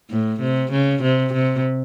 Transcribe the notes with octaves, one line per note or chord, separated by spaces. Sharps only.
A2
C3
C#3
C3
C3